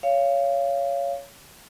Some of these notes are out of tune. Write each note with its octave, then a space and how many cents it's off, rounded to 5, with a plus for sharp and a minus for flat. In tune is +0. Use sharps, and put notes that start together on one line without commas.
C#5 +15 F5 -20